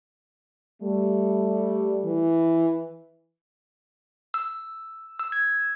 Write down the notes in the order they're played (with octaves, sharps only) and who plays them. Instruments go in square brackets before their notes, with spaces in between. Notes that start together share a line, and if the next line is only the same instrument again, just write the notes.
[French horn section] G3 A3
[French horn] E3
[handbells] E6
E6
G#6